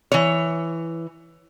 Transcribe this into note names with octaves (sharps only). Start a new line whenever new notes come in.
E3 C#5